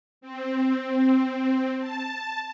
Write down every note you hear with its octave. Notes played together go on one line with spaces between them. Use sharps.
C4
A5